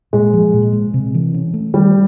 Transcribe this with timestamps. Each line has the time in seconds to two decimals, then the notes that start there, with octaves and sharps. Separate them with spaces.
0.13 A#2 G#3
0.33 F3
0.54 A#2
0.73 G#3
0.94 C3
1.14 E3
1.34 C#4
1.54 A3
1.74 D#3 G3